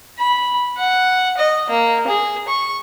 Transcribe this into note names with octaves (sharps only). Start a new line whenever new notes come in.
B5
F#5
D#5
A#3
G#4
C#6